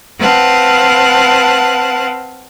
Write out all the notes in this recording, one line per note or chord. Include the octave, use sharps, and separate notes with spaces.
C4 B4 F5 F#5 A5